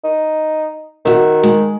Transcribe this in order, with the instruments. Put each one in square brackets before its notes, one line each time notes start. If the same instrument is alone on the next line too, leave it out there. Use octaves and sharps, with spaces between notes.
[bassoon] D#4
[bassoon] D#3 [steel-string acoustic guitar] F#4 E5
[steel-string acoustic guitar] G#3